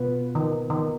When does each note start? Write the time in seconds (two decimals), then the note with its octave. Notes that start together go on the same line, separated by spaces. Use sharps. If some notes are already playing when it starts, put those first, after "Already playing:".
Already playing: B2 B3 F4 B4
0.35 D#3
0.70 D#3